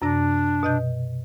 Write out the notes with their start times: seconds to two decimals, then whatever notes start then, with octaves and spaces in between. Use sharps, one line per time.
0.02 F#2 C3 D4 A#6
0.63 B2 D#5 G6